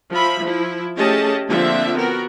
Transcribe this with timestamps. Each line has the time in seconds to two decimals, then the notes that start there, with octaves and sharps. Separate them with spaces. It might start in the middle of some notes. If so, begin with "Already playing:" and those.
0.11 F3 F4 E5 B5
0.41 F3 E4
0.97 A3 C#4 G4 G#4 D#5 A5
1.48 D3 F3 A#3 C4 D4 E5
1.96 B3 F#4 A#4